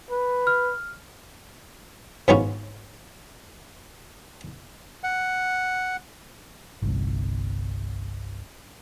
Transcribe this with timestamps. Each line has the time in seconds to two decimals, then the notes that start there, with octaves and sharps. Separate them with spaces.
0.11 B4
0.47 F6
2.28 G#2 B3 C#4 F4 F#4
5.04 F#5
6.82 G1 C2